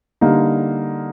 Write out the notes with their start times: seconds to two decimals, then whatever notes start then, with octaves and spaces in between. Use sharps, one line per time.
0.21 D3 G3 A#3 D#4